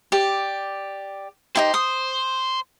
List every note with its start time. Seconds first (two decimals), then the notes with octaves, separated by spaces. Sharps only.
0.12 G4 D5
1.55 D#4 E4 G4 C5
1.74 D#6